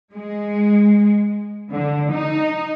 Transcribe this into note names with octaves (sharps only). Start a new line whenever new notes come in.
G#3
D3
D#4